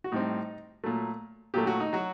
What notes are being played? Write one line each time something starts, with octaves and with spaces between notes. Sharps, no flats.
F#4
A2 G3 C4 D#4
A#2 F#3 A3
A#2 F#3 A3 G4
F#4
D#4
F#3 F#4